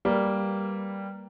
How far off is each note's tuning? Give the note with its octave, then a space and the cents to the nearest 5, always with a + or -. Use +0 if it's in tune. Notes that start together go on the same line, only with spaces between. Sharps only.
G3 +0 A#3 +0 B4 +0